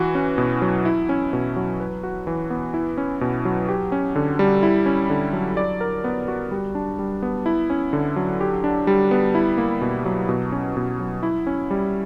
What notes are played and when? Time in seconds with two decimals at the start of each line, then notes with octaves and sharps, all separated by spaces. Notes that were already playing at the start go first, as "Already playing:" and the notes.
Already playing: E3 F#4
0.15 C#4
0.38 B2
0.62 F#3
0.85 E4
1.09 C#4
1.33 B2
1.56 F#3
1.80 B4
2.03 F#4
2.27 E3
2.50 B3
2.74 E4
2.98 C#4
3.21 B2
3.45 F#3
3.68 G4
3.92 C#4
4.16 D3
4.39 G3
4.63 E4
4.86 C#4
5.10 D3
5.33 F#3
5.57 D5
5.81 A#4
6.04 B3
6.28 F#4
6.51 G3
6.75 D4
6.99 G3
7.22 B3
7.46 E4
7.70 C#4
7.93 D3
8.16 F#3
8.41 G4
8.64 D4
8.87 G3
9.11 B3
9.35 E4
9.58 A#3
9.81 B2
10.06 F#3
10.29 B2
10.52 C#4
10.77 B2
11.00 F#3
11.23 E4
11.47 C#4
11.71 G3